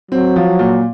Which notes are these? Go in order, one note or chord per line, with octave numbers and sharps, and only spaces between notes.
F#3 C4
F3
A#2